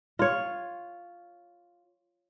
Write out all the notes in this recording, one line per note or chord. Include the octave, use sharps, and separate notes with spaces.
F4 C#5